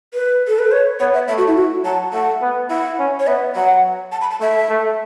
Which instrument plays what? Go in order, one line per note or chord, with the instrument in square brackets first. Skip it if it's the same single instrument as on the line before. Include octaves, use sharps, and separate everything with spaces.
[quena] B4
A4
B4
C#5
[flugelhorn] B3 [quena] C#5
[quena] E5
[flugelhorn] A3 [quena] E5
[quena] F#4
E4
F#4
[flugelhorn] F#3 [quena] A5
[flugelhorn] A3 [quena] F#5
[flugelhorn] B3
[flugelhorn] E4 [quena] F#5
[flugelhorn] C#4
[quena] C#5
[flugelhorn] B3 [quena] E5
[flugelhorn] F#3 [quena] F#5
[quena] A5
B5
A5
[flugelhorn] A3 [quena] E5
[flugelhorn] A3